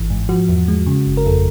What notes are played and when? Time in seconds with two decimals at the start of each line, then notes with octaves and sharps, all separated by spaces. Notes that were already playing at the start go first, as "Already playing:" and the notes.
Already playing: G#1 E3
0.10 G#2
0.29 F3 F#4
0.49 E2
0.68 G#3
0.87 C#3
1.06 G1
1.17 A#4
1.25 F2 A4